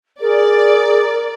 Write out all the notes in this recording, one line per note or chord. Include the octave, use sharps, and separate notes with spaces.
G#4 A#4 D5